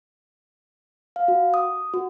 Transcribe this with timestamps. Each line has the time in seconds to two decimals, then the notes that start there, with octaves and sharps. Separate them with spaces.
1.16 F5
1.28 F#4
1.54 D#6
1.94 F#4